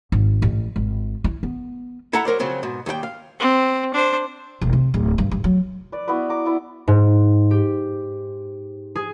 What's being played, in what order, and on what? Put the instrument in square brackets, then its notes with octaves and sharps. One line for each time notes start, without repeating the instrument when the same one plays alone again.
[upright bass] G#1
A1
G#1
E4
B3
[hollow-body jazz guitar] E4 A4 E5 F#5 A#5
F#3 A#4 C5 D5
C#3 F3 F#3 C4
G#2 B2
D#2 G3 G4 G5
F5
[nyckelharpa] C4
D4 C5
[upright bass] E1
C3
D1
G2
G2
F#3
[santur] B4 D5
B3 E4 F#4 B4
A#5 D6
B3 E4 D5 F#5
[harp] G#2
G4
G#4